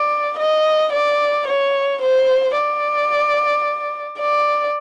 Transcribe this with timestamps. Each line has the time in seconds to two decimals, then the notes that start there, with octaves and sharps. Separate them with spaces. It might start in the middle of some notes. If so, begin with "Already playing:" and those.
Already playing: D5
0.39 D#5
0.93 D5
1.48 C#5
2.02 C5
2.56 D5
4.19 D5